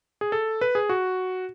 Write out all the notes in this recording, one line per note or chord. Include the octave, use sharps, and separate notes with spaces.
G#4
A4
B4
G#4
F#4